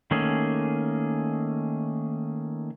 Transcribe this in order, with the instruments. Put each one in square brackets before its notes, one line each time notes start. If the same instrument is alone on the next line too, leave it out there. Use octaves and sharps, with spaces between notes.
[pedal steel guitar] D#3 A3 A#3 C#4 G#4